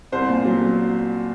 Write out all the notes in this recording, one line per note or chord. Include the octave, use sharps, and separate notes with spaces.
C2 C5
A#2
F#3
F#3